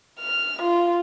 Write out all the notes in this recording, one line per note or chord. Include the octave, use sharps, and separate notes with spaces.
F6
F4